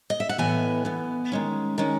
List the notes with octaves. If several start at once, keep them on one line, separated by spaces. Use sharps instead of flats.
D#5
E5
F#5
A2 E3 B3 G#5
E3 B3
D#3 G#3 C#4
D#3 G#3 C#4